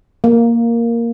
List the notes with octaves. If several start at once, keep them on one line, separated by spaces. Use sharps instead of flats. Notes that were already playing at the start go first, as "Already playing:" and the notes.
A#3